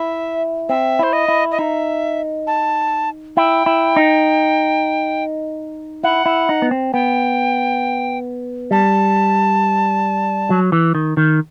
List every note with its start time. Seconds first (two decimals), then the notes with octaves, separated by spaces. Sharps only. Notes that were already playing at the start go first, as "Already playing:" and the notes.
Already playing: E4 E5
0.69 C4 E5
0.99 E4 C5
1.13 D#5
1.28 E4
1.52 D#5
1.59 D#4 E5
2.47 A5
3.37 E4 G5
3.66 E4
3.96 D#4
6.03 E4 F#5
6.26 E4
6.49 D#4
6.62 B3
6.71 C4
6.94 B3 G5
8.71 G3 A5
10.50 F#3
10.72 E3
10.95 D#3
11.17 D#3